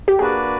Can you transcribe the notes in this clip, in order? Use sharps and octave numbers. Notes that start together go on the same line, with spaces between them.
G4
A#3 D4 F#4 G#4 B4 D5